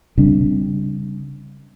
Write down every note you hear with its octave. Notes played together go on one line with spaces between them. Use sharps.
C#3 G3 C4 D4